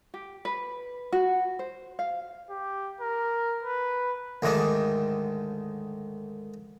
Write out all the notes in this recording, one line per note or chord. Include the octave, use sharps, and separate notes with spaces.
G4
B4
F#4
C5
F5
G4
A#4
B4
D2 G#2 D#3 D4